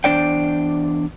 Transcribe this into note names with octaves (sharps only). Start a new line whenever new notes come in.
E2 G2 D4 C5 D5 G5